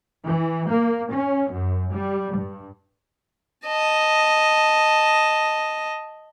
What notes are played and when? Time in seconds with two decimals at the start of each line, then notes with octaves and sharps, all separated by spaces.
0.24 E3
0.69 A#3
1.13 C#4
1.52 F#2
1.91 G3
2.37 G2
3.67 D#5 A5